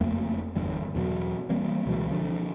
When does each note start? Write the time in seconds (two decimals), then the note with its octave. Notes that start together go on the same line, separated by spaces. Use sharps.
0.01 F#1 F2 A3 A#3
0.55 G1 E2 G2
0.95 E2 B2 F#3
1.49 E3 G3 A#3 C4
1.86 C#2 B2 E3 G#3
2.09 D3 F3 D4